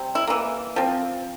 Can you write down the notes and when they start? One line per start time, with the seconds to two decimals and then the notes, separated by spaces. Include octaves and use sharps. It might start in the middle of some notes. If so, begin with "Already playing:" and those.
Already playing: C3 G3 C4
0.15 E4
0.27 E3 A#3
0.76 F3 C4